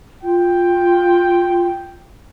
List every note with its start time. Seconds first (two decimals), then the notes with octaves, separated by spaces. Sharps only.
0.23 F4 G5